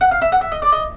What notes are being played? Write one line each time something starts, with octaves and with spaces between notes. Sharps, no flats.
F#5
F5
E5
F#5
E5
D#5
D5
D#5